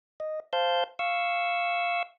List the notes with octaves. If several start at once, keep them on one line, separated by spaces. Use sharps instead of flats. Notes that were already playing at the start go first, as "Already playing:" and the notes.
D#5
C5 F5 A5 G6
F5 C#6 E6